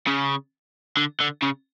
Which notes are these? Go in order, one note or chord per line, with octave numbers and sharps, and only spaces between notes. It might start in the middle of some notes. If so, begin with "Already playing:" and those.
C#3
D3
D3
C#3